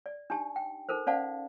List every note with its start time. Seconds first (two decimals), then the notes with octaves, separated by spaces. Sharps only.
0.06 D5
0.30 D4 D#4 G4 A5
0.56 G5
0.89 D#4 A4 A#4 C5
1.07 C#4 C5 D5 F5 F#5 A5